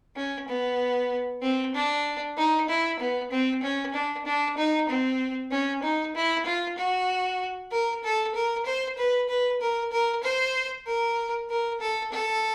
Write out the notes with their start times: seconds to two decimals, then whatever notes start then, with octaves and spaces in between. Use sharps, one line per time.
0.16 C#4
0.48 B3
1.42 C4
1.75 D4
2.37 D#4
2.69 E4
3.00 B3
3.31 C4
3.63 C#4
3.94 D4
4.26 D4
4.57 D#4
4.89 C4
5.51 C#4
5.83 D#4
6.15 E4
6.46 F4
6.78 F#4
7.71 A#4
8.04 A4
8.35 A#4
8.66 C5
8.98 B4
9.29 B4
9.61 A#4
9.92 A#4
10.24 C5
10.87 A#4
11.50 A#4
11.81 A4
12.12 A4